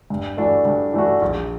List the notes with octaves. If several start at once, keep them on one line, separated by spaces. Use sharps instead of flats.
G2
E3 A3 D4 F#4
G2
E3 A3 D4 F#4
A#1